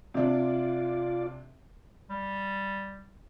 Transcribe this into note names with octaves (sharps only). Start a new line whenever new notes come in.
C3 D4 F4 D5
G3